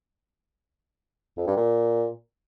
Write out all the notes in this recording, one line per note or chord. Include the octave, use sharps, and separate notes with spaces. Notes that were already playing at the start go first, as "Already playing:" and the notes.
F2
G2
A#2